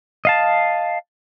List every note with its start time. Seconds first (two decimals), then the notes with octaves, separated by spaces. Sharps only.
0.25 D#5 F5 A5